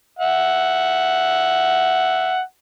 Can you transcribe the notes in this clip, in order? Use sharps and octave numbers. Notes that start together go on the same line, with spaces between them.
E5 F#5